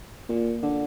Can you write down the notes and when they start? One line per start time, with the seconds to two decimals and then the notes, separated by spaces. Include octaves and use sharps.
0.29 A#2
0.63 D3